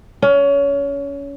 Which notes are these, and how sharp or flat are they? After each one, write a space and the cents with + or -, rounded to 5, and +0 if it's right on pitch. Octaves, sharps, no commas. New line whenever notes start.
C#4 +25